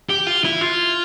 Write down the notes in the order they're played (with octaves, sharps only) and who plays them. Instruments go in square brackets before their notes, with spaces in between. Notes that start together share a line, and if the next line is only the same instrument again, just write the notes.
[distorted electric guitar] G4
F4
E4
F4